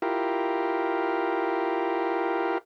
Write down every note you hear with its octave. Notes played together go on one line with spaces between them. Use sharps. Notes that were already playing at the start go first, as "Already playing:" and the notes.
E4 F4 G4 A#4